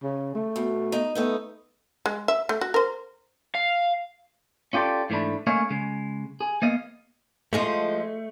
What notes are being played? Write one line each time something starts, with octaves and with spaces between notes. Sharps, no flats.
C#3
A3
B2
D#4
A3 B3 D#4
G#3
E5
A3
F#4
A#4 C5
F5
C#4 F4 G4 A4 D5
G#2 E3 A3 D4 B5
A3 A#3 C#4 C#5 D#5 F5
C#3 G#3
G#4
A#3 B3 D#5 F5
F3 G#3 A3 F4